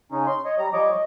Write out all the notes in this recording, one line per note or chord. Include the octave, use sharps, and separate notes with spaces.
C#3 C#4 D#4
C6
C#5 D#5
G3 A#5
F3 G3 C#5 D#5 D6
D#5